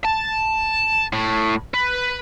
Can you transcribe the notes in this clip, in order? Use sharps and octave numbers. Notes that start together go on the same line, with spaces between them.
A5
A2
B4